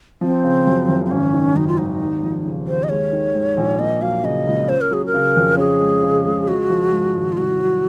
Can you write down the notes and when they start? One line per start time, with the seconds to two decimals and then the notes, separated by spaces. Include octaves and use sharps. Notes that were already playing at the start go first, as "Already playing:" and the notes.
0.21 F3 C4
0.44 C#3
0.67 F#2
0.88 F#1
1.05 C4
1.10 G#1 C#4
1.33 D#3
1.55 F#2 D#4
1.67 F4
1.78 G#1 D#4
2.00 D#2
2.23 F3
2.45 C#3
2.67 D#2 C5
2.83 D#5
2.89 G#3 C#5
3.13 D#3
3.35 G#2
3.57 A#1
3.79 A#3 D#5
4.01 F#3 F5
4.24 C#3 D#5
4.47 C#2
4.68 C#4 C5
4.81 A#4
4.91 F#3 G#4
5.06 A#4
5.14 C#3
5.36 F2
5.57 C#4 G#4
5.80 G#3
6.03 C#3
6.26 C#2
6.48 G#3 F#4
6.70 F3
6.92 G#2
7.15 G#1
7.32 F4
7.37 C2 F#4
7.60 F#3